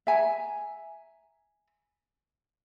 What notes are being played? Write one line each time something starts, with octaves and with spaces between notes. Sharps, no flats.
E5 G#5 A#5